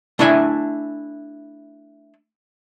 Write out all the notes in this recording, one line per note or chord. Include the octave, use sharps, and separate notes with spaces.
A3 D4 E4 E5 G#5